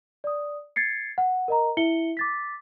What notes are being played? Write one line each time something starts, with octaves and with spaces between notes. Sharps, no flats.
D5 D#6
G#6 A6 C7 C#7
F#5
A#4 D#5 A#5
E4 E5 C#7 G7
D6 A6 B6